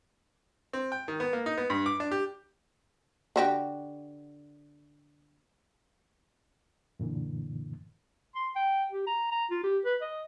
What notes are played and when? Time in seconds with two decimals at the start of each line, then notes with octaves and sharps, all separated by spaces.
0.73 C4
0.92 G5
1.08 D#3
1.20 B3
1.33 A#3
1.46 D#4
1.57 B3
1.70 G2
1.86 D6
2.00 D4
2.11 G4
3.36 D3 F#4 G4
7.00 F#2 A#2 D3 E3
8.35 C6
8.56 G5
8.92 G4
9.07 A#5
9.32 A#5
9.51 F4
9.64 G4
9.85 B4
10.01 D#5